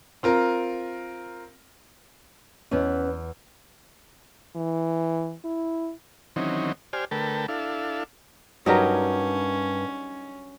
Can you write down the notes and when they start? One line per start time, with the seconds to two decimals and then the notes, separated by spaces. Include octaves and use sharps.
0.23 C4 F4 A#4 A#5
2.71 E2 B3 C#4
4.56 E3
5.44 E4
6.36 D#3 E3 F#3 C4 C#4 D#4
6.93 G4 C5 D5 G#5 F6
7.11 D3 A3 A#4 B4 G5 A5
7.48 D4 E4 A4 F5
8.66 G2 F#3 C#4 D#4 G4 A#4 D#5